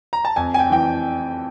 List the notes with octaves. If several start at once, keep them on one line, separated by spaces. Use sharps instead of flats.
A#5
A5
F2 G#5
G#5
G5
E3 G5